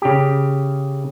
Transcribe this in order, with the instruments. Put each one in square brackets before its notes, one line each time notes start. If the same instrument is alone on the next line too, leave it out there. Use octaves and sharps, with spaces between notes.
[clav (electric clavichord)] C#3 G4